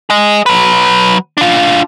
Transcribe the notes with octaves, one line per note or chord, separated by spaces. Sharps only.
G#4 D#5
F#3 B4
D4 F4